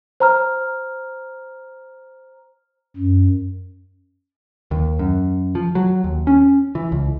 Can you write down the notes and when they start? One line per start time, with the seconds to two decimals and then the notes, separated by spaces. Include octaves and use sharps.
0.20 C5 A#5 F6
2.97 F#2
4.71 D#2
4.99 F#2
5.55 F3
5.75 F#3
6.04 D#2
6.27 C#4
6.75 E3
6.92 C#2